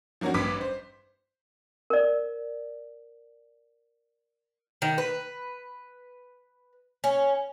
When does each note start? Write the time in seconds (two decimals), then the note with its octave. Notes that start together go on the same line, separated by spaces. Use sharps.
0.21 F3 F#3 A#3 C#4 D4 F#4
0.34 A1 G2 B4 D6 B6
0.61 C5
1.90 A#4 D5
4.82 D#3
4.98 B4
7.04 C#4